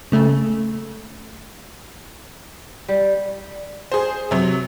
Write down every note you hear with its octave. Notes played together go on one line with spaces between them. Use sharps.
C#3 A3
G3
G#4 C5
C3 F#3